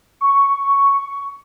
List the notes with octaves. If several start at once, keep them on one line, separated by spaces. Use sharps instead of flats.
C#6